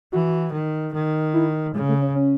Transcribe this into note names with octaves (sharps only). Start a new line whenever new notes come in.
E3 F#4
D#3
D#3
E4
C#3 G#3
A3
C#4
C#4